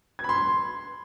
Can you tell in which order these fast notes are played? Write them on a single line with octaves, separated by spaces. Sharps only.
G#6 B5 C6